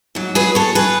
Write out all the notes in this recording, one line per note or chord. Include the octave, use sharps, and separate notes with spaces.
G#2 F#3
G#4 B4
A4 C#5
G#4 B4